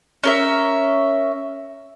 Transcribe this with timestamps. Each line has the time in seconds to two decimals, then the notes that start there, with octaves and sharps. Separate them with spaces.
0.23 C#4 A#4 E5